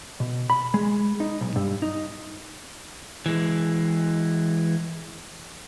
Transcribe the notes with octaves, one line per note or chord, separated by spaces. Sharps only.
B2
B5
G#3
D#4
B1
G2
D#4
E3 G#3